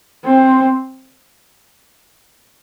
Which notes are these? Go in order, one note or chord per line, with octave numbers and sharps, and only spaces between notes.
C4